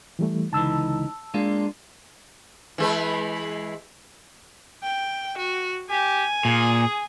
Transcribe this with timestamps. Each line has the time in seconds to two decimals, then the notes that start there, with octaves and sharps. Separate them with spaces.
0.19 E3 G3 A3
0.53 C#2 D3 E3 D#4 A5 E6
1.34 G#3 A#3 D4 F4
2.78 E3 G#3 B4
4.84 G5
5.38 F#4
5.90 G4 G#5
6.45 A#2 G#4